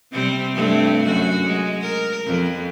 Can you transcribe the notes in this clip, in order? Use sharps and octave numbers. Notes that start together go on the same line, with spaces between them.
C3 G3 C4
G2 A3 C4
F#2 F#4
G#3
A#4
F2